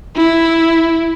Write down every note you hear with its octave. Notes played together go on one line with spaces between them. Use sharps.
E4